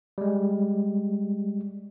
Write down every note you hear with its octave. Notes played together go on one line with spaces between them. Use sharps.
G3 G#3